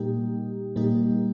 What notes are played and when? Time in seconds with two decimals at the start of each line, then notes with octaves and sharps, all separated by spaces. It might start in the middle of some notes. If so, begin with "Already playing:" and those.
Already playing: A#2 G3 A#3 D#4 G4
0.76 A#2 G3 A#3 D#4 G4